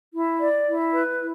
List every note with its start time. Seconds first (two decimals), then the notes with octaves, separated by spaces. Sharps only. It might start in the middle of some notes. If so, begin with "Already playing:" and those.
0.13 E4
0.40 D5
0.66 E4
0.92 B4
1.19 E4